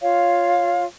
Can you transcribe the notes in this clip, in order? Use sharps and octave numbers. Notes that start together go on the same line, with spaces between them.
F4 C#5 F5